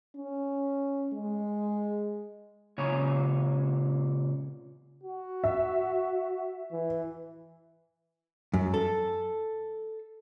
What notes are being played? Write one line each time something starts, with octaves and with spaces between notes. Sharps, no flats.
C#4
G#3
A#2 C#3 C#5
F#4
E5
E3
F#2
A4